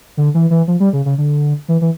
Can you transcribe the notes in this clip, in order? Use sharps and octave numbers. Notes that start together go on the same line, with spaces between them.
D3
E3
E3
F3
G3
C#3
C#3
D3
E3
E3